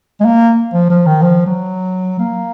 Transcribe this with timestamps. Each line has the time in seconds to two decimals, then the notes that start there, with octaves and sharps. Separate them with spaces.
0.20 G#3
0.25 A#3
0.73 F3
0.90 F3
1.06 D#3
1.22 F3
1.46 F#3
2.19 A#3